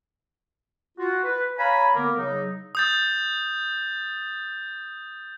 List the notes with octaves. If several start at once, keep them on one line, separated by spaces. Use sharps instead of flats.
F4 F#4
B4
C#5 F5 G#5 A#5 B5
D3 A#3 B3 A#4 D6
C#3 F#3 D#4
D#6 G6 A6